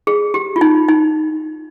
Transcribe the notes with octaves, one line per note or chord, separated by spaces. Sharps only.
G#4
G4
F4
D#4
D#4